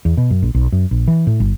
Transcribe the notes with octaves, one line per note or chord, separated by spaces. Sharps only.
E2
B2
F#2
A#1
B1
F#2
A#1
E3
A2
G1